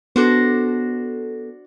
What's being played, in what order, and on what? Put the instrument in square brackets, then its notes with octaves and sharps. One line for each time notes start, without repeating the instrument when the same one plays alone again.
[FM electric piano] B3 A4 [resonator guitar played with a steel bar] D4 F#4 C5